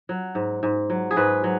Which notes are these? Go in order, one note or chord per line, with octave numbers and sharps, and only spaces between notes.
F#3
G#2
G#2
F#3
G#4
G#2 B4
F#3